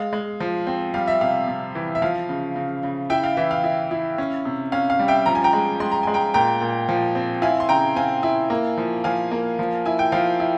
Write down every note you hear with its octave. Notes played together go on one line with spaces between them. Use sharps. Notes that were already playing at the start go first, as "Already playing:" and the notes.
Already playing: G#3 F5
G#3
F3
C4
G3 F5
E5
C3 F5
C3
E3
E5
F3 F5
C#3
C#3
C#3
E4 E5 G5
F5
E3 E5
F5
E4
E4
C#4
C3
C#4 F5
F5
G3
E5 G5
F3 A#5
G#5
G5 A#5
G#3
G#3 C6
A#5
G#3 G#5
G5 A#5
A#2 G5 A#5
A#2
F3
C4
E4 F5 G#5
C6
C#3 G5 A#5
C4 F5 G#5
E4
A#3
F3
F3 F5 G#5
A#3
F3
E4 G#5
G5
F3 F5
E4